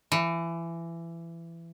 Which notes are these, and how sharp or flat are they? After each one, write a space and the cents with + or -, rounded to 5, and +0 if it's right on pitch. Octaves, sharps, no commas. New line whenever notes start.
E3 +25